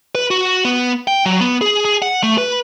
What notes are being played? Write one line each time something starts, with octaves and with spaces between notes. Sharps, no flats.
B4
F#4
B3
G5
F#3
B3
G#4
G#4
F#5
A3
B4